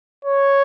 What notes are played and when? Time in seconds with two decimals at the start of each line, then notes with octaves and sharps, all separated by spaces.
0.25 C#5